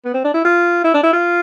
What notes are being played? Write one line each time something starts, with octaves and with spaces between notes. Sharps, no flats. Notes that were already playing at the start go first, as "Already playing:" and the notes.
B3
C4
D4
E4
F4
E4
D4
E4
F4